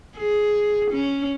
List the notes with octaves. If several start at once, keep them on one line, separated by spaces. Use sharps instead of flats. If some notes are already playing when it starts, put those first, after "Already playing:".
G#4
C#4